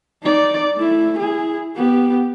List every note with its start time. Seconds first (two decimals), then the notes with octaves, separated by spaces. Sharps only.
0.23 D#4 D5
0.76 A3 E4
1.19 E4 G#4
1.76 B3 G4